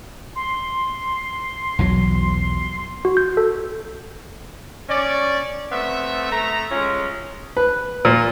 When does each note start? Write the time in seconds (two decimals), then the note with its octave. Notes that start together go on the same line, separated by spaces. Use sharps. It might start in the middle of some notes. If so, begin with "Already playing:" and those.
0.36 C6
1.79 B1 E2 F#3
3.05 F#4
3.17 G6
3.37 A4
4.89 C#4 D5
5.71 A3 B3 C4 E5
6.31 A3 A#5
6.71 G#3 C#4 F4
7.57 B4
8.05 A#2